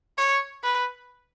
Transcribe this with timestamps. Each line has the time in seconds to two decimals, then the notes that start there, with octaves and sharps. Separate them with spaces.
0.18 C#5
0.64 B4